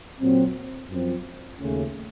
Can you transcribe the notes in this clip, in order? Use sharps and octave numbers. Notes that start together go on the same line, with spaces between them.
A#2 F#3 C4
F#2 F3 C4
D#2 C#3 A3 C#4